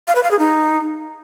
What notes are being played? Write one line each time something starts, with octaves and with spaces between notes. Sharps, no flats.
F5
B4
F5
G#4
D#4